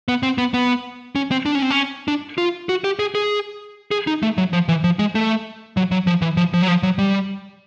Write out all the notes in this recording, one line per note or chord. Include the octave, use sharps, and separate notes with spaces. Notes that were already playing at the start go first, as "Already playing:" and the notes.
B3
C4
B3
B3
C#4
C4
D4
C#4
C4
C#4
D4
F4
F#4
G4
G#4
G#4
G#4
D#4
A3
F#3
F3
E3
F3
G#3
A3
F#3
F#3
F3
E3
F3
F3
F#3
F3
F#3
G3